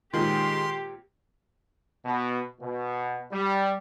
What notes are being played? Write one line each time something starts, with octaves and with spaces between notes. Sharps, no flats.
A#2 D#3 G#3 C4 G4 C6
B2
B2
G3